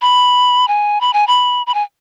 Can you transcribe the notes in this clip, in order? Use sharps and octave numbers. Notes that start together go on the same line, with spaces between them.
B5
G#5
B5
G#5
B5
B5
G#5